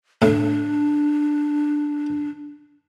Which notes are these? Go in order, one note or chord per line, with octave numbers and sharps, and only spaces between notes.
A2 D4